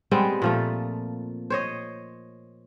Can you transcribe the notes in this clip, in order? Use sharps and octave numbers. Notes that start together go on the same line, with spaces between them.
G3 G#3 B3 C4
A#2 F3 A3
C5 C#5 D#5